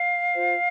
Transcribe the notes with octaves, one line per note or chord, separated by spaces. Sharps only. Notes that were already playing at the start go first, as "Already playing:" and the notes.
Already playing: F5
F4 C5